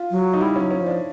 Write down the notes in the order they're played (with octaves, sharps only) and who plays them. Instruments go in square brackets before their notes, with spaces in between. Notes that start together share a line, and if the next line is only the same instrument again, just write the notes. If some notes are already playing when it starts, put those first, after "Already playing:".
Already playing: [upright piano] F4
[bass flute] F#3
[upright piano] D#4
[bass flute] G3 [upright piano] E4
[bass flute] F#3 [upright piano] C#4
[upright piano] C#4
[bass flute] F3
[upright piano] D4